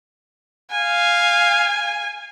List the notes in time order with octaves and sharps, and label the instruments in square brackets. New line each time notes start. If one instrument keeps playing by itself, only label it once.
[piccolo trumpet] F5 [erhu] G#5